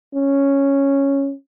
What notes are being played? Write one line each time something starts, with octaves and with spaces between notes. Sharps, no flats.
C#4